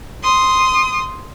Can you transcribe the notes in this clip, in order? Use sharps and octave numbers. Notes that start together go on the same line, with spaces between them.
C6 D#6